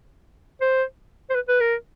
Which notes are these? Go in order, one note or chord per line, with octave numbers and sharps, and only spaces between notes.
C5
C5
B4
B4
A#4